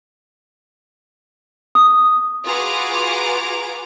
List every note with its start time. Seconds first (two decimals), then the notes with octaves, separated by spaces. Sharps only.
1.75 D#6
2.44 F4 F#4 G#4 B4 A#5 D6